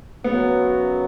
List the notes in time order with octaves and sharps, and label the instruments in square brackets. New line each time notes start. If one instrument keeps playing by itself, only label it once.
[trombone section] F#2 C#3 F#3 [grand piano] B3